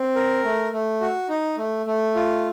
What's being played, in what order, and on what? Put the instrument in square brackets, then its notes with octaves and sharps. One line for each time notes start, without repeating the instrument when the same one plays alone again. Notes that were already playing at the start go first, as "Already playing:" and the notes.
Already playing: [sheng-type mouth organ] C4
A#4
A3
A3
F#4
D#4
A3
A3
F4